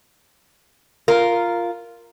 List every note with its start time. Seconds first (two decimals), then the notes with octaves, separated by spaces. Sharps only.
1.08 F4 A#4